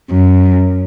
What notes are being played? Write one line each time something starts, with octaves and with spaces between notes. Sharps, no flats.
F#2